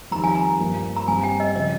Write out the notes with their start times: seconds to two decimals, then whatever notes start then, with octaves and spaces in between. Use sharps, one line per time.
0.11 F2 D#3 G3 A#5
0.24 G#5
0.35 A#5
0.59 G2 F3 A#3
0.96 A#5
1.08 G2 G3 C4 G#5
1.23 G5
1.40 D#5
1.55 C#3 F3 D#5